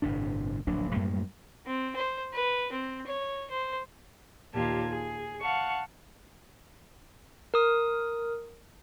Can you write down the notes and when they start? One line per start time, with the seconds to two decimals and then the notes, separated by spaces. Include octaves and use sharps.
0.02 G1 A2 C3 D4
0.67 D1 A#1 F#3 D4
0.92 F#2 A2 G3 A#3
1.66 C4
1.96 C5
2.33 B4
2.72 C4
3.06 C#5
3.50 C5
4.53 D#2 A#2 F4 G4 A5 G#6
4.90 G#4
5.40 F5 F#5 A5 C#6
7.54 A#4 D#6